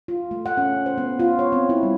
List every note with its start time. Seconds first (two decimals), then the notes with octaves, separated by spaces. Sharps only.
0.08 F4
0.31 A3
0.46 F#5
0.58 C#4
0.86 C5
0.98 B3
1.19 F4
1.39 C#5
1.52 C4
1.69 E4
1.83 G3